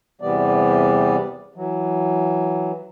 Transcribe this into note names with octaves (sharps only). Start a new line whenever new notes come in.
E2 C3 E3 G3 B3 D5
E3 F#3